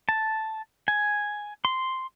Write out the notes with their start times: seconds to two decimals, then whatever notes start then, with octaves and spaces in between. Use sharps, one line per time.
0.09 A5
0.88 G#5
1.65 C6